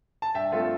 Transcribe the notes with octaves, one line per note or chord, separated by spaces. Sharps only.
A5
G2 E5 G5
F3 A3 C4 F4 A4